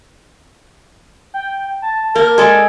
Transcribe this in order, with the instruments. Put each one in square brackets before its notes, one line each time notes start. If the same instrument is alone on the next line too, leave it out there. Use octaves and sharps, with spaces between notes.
[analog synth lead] G5
A5
[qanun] A#3 [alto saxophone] A#4
[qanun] G#3 A4 D5 [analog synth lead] G#6